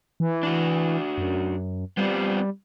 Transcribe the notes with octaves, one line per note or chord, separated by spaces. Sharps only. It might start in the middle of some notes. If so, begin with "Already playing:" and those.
E3
D4 F#4
F#2
G3 B3 C4 F4